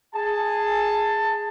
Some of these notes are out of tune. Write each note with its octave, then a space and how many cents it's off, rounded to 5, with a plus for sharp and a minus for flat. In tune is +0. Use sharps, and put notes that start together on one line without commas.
G#4 +0 A5 +15